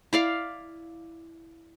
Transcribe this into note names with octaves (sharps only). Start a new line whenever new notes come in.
E4 D5 F5